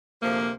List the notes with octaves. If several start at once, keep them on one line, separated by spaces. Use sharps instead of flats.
D2 C3 F3 A#3